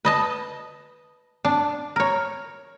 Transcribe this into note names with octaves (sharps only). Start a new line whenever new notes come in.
B4 D#5 A5
D4
A#4 C#5